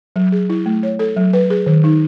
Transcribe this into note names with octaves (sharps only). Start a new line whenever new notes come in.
F#3
G#4
E4
A3
C#5
A4
F#3
B4
G#4
D#3
D#4